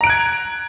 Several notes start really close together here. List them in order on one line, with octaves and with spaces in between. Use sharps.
A#5 D7 F#6 G#6